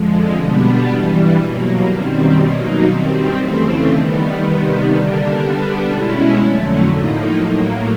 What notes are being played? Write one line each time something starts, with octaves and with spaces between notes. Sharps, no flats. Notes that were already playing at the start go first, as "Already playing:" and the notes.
Already playing: F2 D3 F3 G#3
B2 G3 B3 D4
G2 E3 G3
B2 F#3 A#3
F#2 D#3 G3 C4
B2 F#3 A#3 D#4
G2 D#3 G3 C4
F2 C#3 E3 A3 C4
D#3 G3 B3
C3 D#3 G3 B3
D3 G3 A#3 D4
D3 G3 B3 D4
B2 G#3 C#4 E4
F2 D3 F#3 A3
A2 F3 A#3 D#4
A2 F#3 A#3